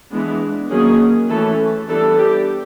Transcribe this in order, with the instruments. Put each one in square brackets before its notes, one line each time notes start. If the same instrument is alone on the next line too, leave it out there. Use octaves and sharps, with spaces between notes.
[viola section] E3 G#3 B3 D4
D#3 F#3 A#3 C#4 G#4
E3 A3 C#4 A4
E3 G3 B3 D4 A4
G4